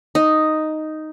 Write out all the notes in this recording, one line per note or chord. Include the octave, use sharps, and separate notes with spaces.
D#4